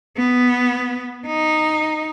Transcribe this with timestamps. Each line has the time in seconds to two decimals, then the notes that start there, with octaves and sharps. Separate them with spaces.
0.17 B3
1.26 D#4